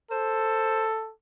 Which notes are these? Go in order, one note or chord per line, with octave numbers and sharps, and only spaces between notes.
A4 C5